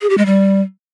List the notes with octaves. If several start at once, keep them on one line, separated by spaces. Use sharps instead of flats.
G#4
G4
G#3
G3